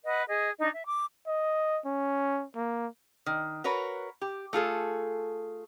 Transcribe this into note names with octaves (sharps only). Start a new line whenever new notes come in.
B4 D#5 F#5
G#4 D#5
D4 D#4 D#5
E5
D6
D#5
C#4
A#3
D#3
F#4 A#4 B4 C#5
G4
A3 F4 G#4 A4